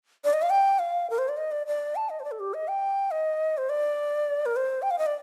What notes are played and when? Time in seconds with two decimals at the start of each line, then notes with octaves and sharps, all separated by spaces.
0.24 D5
0.33 D#5
0.42 F5
0.50 G5
0.79 F5
1.10 A#4
1.18 C5
1.28 D5
1.37 D#5
1.51 D5
1.67 D5
1.96 A5
2.09 D#5
2.20 C5
2.24 D5
2.31 A4
2.39 G4
2.54 D#5
2.68 G5
3.11 D#5
3.57 C5
3.69 D5
4.46 A#4
4.56 C5
4.82 G5
4.90 F5
4.98 D#5
5.06 D5